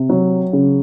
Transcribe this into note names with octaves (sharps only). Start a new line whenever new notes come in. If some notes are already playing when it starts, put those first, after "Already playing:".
Already playing: C3
F#3
C#3